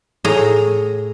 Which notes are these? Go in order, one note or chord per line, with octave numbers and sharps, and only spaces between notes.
A2 G#4 A#5